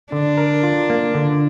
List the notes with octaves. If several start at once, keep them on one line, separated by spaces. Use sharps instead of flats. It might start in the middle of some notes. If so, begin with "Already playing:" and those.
D3 D4
A#4
F4
A#3
D3